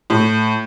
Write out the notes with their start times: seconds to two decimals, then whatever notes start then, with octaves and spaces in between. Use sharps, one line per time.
0.10 A2